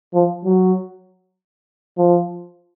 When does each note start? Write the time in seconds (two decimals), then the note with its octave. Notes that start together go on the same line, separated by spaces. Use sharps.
0.14 F3
0.45 F#3
1.98 F3